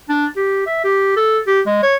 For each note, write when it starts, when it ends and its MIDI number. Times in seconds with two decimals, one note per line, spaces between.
0.09 0.27 62
0.36 0.65 67
0.67 0.80 76
0.84 1.13 67
1.16 1.39 69
1.47 1.61 67
1.66 1.80 56
1.83 1.96 73